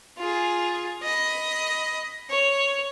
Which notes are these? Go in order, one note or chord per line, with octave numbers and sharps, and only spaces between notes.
F4 G#4
D#5 B5
C#5